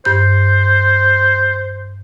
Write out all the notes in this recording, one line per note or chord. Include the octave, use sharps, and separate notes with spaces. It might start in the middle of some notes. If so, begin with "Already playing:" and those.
G2 C5 G6